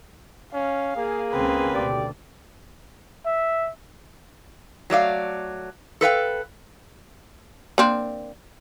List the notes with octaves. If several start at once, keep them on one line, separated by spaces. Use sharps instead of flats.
C#4 F5
A#3 G#4
C#2 C#3 C4 B4
D2 B2 G4 D5
E5
F#3 A3 D5 F5
A4 B4 F5 G5
A#3 C4 D4